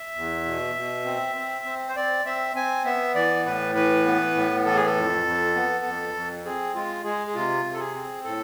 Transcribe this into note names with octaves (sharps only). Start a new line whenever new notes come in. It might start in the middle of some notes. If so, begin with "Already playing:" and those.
Already playing: E5
E2
B2
B2
C4
C4
C4
C5
C4 D5
C4 E5
C4 G#5
B3 E5
E3 D5
A2 B4
E3 B4
B3
A2
E3 A4
G#4
A4
F2
F2
B3
F2
F2
C4 G#4
G#3 F4
G#3 G#4
G#4
C3 F4
C3
A4
G#4
C4
A2 A4